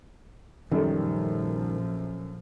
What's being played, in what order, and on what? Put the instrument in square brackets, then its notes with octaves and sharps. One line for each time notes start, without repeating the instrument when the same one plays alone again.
[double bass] A#1 F3 [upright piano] F#2 A4 [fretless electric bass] D#3 G3